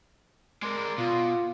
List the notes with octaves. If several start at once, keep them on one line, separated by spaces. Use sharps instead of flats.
G#3 A#4 D5 C6
B2 F4